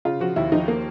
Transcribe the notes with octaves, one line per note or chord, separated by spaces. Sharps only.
C#3 F4
F3 F#4
D#2 E4
F3 D#4
A#3